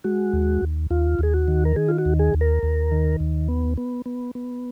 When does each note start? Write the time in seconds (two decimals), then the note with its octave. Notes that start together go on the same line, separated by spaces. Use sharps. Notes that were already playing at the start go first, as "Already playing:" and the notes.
0.04 G#3 F#4
0.33 D#2
0.62 D#2
0.90 D#2 F4
1.19 D#2 G#4
1.34 F#4
1.48 D#3
1.65 A#4
1.76 D#3 G#4
1.88 F4
1.98 F#4
2.05 D#2
2.19 G#4
2.34 D#2
2.41 A#4
2.63 D#2
2.92 D#3
3.20 D#2
3.48 B3
3.77 B3
4.06 B3
4.35 B3